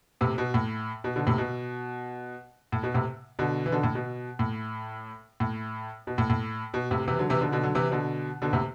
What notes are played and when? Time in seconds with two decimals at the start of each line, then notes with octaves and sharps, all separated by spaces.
0.21 A2 C3
0.38 B2
0.54 A2
1.04 B2
1.16 B2 D3
1.27 A2 C3
1.38 B2
2.72 A2
2.83 B2
2.94 A2 C3
3.39 B2 D3
3.66 E3
3.72 B2 D3
3.83 A2
3.95 B2
4.39 A2
5.40 A2
6.07 B2
6.18 A2
6.30 A2
6.74 B2
6.91 A2 C3
7.08 C3 E3
7.19 D3 F#3
7.30 C3 E3
7.41 B2 D3
7.52 B2 D3
7.63 D3 F#3
7.75 C3 E3
7.91 B2 D3
8.42 B2 D3
8.53 A2 C3